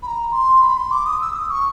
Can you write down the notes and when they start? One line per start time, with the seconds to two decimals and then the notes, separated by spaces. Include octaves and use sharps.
0.02 B5
0.07 A#5
0.32 C6
0.61 B5
0.77 C6
0.91 D6
1.06 D#6
1.21 E6
1.36 D#6
1.51 C#6